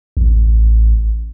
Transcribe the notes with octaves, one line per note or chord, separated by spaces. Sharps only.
A1